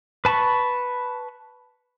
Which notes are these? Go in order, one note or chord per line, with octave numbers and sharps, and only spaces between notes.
B4 A5 B5 C#6